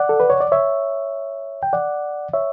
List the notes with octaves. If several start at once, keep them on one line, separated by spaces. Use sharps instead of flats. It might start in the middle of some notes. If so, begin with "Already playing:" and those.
Already playing: D5 F#5
A4
B4
C#5
D5
C#5 E5
G5
D5 F#5
C#5 E5